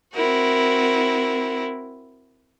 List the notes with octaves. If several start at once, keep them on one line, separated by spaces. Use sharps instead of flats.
C4 E4 F#4 A#4